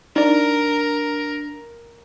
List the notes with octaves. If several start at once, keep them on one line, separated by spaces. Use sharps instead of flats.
D4 D#4 A#4 D5